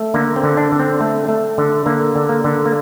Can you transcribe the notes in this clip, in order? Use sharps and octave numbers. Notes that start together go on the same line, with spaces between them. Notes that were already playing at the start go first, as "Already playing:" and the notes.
Already playing: A3
D3 A#3
C4
D3
D4
D3
C4
A3
A3
D3
D3 A#3
D3
A#3
D3
A#3